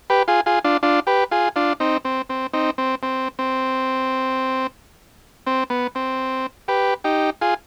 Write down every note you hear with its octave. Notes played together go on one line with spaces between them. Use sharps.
G4 B4
F4 G#4
F4 G#4
D4 F4
D4 F4
G4 B4
F4 G#4
D4 F4
C4 D#4
C4
C4
C4 D#4
C4
C4
C4
C4
B3
C4
G4 B4
D#4 G4
F4 G#4